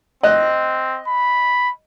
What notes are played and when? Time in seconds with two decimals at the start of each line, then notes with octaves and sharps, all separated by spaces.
0.23 C4 D#5 F#6
1.08 B5